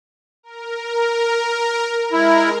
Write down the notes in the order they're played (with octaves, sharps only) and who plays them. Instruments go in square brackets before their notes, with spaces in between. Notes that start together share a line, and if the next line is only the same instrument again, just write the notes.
[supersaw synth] A#4
[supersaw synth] G#3 A#4 [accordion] E4